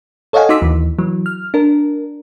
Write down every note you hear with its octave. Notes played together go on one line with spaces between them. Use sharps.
A4 C#5 D#5 F5 F#5 G#5
D#4 F#4 C6 D6 E6 B6
D#2 E3
E3 F#3
F6
D4 A#4